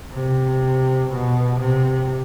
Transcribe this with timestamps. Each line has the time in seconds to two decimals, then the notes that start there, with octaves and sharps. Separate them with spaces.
0.12 C3
1.10 B2
1.59 C3